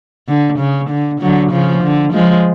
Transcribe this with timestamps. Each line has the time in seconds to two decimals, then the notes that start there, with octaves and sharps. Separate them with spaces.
0.28 D3
0.59 C#3
0.90 D3
1.21 D3 F#3
1.52 C#3 F3
1.83 D3
2.13 F3 G#3